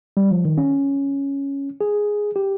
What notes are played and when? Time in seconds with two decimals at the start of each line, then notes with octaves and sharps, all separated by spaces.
0.17 G3
0.31 F3
0.45 D#3
0.58 C#4
1.81 G#4
2.36 G4